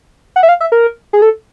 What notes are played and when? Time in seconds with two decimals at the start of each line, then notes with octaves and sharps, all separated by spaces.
0.36 F#5
0.43 E5
0.49 F5
0.61 E5
0.72 A#4
1.13 G#4
1.22 A4